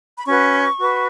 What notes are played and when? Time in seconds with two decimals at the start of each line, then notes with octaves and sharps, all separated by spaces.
0.18 B5
0.26 C#4 F#4 B4 C#6
0.77 F#4 B4